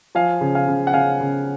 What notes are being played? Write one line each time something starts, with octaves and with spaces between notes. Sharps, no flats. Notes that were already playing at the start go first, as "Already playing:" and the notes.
F3 F5 G#5
C#3
F5 G#5
C#3
F#5
C#3 F5 G#5
C#3